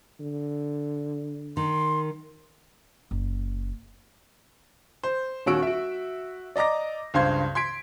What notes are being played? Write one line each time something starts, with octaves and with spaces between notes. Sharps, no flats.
D3
D#3 C6
F#1
C5
D#1 D#2 C#4 F#4 E6 D7
F#4 E5
D5 D#5 A#5 D6 A#6
C#2 G2 C5 F5 C6 G#6
C6 G#6 B6 D7